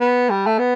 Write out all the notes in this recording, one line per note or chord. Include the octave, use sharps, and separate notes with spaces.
B3
G3
A3
B3